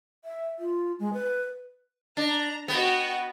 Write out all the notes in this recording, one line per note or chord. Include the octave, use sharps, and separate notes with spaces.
E5
F4
G#3
B4
D4 A#5
B3 F#4 D#5 G5